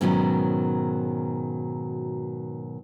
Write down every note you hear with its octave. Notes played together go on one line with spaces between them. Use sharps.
G#2 B2 D#3 F#3 C#4